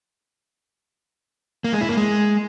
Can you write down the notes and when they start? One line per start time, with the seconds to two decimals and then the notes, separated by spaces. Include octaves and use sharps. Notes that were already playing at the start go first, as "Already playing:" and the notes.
1.64 A#3
1.73 G#3
1.81 E4
1.89 A#3
1.97 G#3